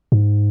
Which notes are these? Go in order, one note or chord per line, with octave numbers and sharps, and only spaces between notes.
G#2